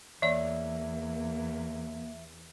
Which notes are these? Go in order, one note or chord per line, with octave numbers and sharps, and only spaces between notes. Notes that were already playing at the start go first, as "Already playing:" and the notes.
E2 E3 A#3 D5 E5